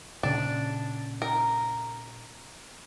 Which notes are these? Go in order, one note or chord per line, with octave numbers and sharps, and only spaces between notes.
A#2 C#3 C#4 D4
A#4